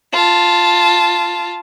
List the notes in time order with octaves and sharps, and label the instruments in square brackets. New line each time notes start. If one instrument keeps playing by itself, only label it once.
[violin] F4 A5